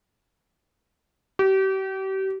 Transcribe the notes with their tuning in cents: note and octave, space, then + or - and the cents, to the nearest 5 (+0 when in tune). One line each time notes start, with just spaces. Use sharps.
G4 -35